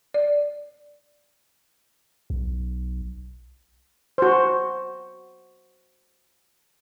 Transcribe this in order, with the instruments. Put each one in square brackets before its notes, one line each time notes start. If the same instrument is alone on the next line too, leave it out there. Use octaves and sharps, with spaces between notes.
[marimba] D5
[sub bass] B1
[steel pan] F#4 C5